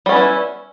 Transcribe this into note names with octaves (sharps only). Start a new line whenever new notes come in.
G3 B3 C#4 E4